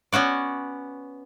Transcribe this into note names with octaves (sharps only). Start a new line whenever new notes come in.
B3 C#4 F#4 D5